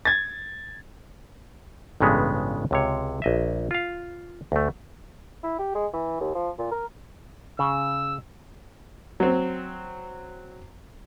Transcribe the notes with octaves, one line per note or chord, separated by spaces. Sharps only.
G#6 A6
A1 G2 C#3 G#3 B3
C#2 C3 C#5
A#1 D#5 E5
F4 F5
D2 A3
E4
G4
G#3
E3
D#2
F3
A#2
A#4
C#3 E6
F#3 C4